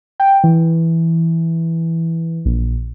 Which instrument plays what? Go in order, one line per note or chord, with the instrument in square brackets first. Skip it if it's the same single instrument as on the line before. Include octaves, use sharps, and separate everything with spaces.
[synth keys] G5
E3
A#1